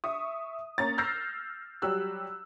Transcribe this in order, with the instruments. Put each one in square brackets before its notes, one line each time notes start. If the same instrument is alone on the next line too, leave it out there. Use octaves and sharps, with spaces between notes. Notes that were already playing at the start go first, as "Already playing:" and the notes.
[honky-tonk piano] E5 C#6 D#6
A#3 C#4 A#5 A6
E6 F6 G6 A6 A#6 C7
F#3 G3 G4 E6 F#6